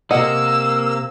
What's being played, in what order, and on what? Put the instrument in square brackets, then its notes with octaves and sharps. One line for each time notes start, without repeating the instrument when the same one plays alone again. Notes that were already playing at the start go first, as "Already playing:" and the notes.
[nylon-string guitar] C3 F#5 [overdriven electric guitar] A#3 [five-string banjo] D#5 [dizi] E6